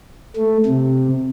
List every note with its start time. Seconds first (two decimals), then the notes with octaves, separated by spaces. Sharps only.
0.36 A3
0.66 C3